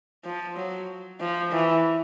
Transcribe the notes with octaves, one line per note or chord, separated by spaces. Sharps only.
F3
F#3
F3
E3